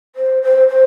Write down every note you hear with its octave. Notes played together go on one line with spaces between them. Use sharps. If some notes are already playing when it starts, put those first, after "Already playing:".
C5
C5
C5